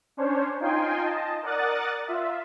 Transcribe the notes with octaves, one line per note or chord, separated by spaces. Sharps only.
C#4 D4 C5 C#5
D#4 F4 G5 G#5 C6
D#5 A5
A#4 D5 F#5 D#6 F#6 A6
F4 E5